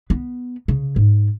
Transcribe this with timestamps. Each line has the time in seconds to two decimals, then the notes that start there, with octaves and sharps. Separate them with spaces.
0.10 B3
0.68 C#3
0.96 G#2